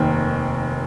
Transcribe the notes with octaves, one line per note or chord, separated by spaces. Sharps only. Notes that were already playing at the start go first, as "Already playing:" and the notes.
Already playing: F1 D#2 D#3 G5